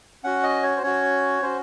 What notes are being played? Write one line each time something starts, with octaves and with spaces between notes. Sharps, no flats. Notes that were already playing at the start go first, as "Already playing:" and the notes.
C#4 F#4 F#5
D#5
C#5
C5
C#4 F#4 C#5
C#4 F#4 C5